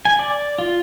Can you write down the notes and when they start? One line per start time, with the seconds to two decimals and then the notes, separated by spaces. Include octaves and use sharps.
0.05 G#5
0.19 D5
0.59 F4